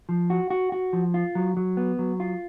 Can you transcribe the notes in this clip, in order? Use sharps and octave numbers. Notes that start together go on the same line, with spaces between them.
F3
F#4
F#4
F#4
F3
F4
F#3
F#3
B3
F#3
F4